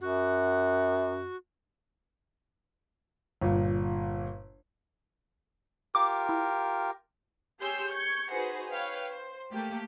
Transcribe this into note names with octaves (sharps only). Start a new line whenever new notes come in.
F#2 F#4
G1 A#2
F4 G4 A#4 D6
E4
G4 G#4 C#5 C6 E6 G6
C#6 G6 G#6 C#7
D#4 F#4 G#4 B4 C5
B4 C#5 F5 G5
C5
A3 A#3 G4